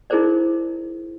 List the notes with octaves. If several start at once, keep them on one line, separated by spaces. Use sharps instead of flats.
D#4 E4 G#4 A#4 C5 D5